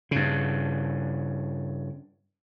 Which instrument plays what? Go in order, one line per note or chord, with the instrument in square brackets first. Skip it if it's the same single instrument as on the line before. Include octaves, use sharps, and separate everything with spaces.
[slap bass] G2 C#3